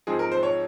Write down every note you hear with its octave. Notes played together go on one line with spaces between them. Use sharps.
G#2 F3 G#3 C4 G#4
A#4
C5
C#5